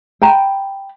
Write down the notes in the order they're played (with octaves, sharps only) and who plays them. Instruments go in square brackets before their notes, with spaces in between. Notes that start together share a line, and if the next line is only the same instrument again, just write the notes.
[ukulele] G5 A#5 B5